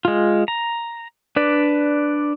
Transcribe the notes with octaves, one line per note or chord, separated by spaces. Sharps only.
G#3 F4
A#5
D4 B4 D5